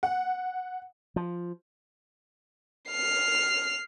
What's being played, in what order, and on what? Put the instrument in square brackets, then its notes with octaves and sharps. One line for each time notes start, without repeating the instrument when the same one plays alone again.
[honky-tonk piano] F#5
[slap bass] F3
[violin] F6 C7